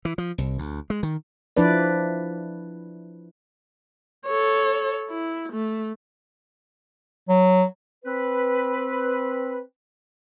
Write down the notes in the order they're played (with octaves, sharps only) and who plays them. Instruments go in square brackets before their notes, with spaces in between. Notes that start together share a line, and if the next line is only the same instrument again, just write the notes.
[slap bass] E3
F3
C2
D2
G#3
D#3
[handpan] F3 D4 E4 B4 D5
[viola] A4 C#5
E4
A3
[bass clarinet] F#3
[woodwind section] C4 B4